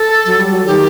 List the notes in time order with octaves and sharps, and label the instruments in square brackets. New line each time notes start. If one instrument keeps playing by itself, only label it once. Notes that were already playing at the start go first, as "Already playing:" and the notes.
Already playing: [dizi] A4
[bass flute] F#3
G3
F#3
[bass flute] D#3 [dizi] G4